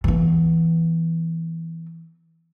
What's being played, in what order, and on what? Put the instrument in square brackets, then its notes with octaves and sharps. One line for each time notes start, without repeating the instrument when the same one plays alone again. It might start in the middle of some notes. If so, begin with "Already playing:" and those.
[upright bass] E3 B3